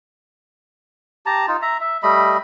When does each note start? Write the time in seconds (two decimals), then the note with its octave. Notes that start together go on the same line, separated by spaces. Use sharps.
1.26 G4 A5 A#5
1.48 D#4 F4
1.62 E5 A#5
1.81 E5
2.03 G3 A3 D#5 B5